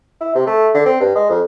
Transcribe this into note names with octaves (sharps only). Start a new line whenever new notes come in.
E4
C3
A3
D3
C4
G2
G#3
F2